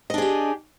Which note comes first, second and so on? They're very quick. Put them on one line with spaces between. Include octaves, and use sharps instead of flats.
D#5 D4 G#4 G4